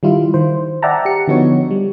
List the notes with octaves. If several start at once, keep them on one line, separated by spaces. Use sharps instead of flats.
D#3 G3 E4 F4
D#3 C5
D5 E5 F#5 G5 A5 A#5
G4 C#7
D3 F3 B3 D#4 F#4 C#5
G3